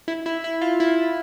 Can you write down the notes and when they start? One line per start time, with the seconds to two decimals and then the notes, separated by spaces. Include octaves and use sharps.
0.08 E4
0.26 E4
0.44 E4
0.61 F4
0.80 E4